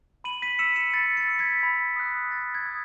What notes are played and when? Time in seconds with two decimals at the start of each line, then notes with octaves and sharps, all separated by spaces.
0.24 B5 D#7 F#7
0.42 B6 D#7
0.59 E6 C#7 E7
0.76 C#7 E7
0.94 B5 A6 C#7
1.17 A6 C#7
1.28 E6
1.39 G#6 B6
1.63 B5
1.96 D#6 F#6
2.31 B5 A6
2.55 G#6
2.66 D#6 F#6